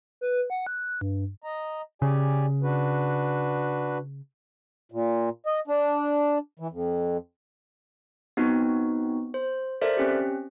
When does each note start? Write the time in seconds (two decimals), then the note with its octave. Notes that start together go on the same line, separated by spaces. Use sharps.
0.21 B4
0.50 F#5
0.67 F#6
1.01 G2
1.43 D#5 A#5
2.02 C#3 G4 D5 G#5
2.62 D4 F#4 B4
4.92 A#2
5.46 D#5
5.68 D4
6.60 E3
6.72 F2
8.37 B3 C4 D#4 F#4
9.34 C5
9.81 A4 A#4 C5 D5 E5
9.97 C4 C#4 G4